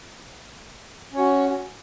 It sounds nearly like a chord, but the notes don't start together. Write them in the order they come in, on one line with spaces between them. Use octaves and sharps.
C#4 C#5 F#4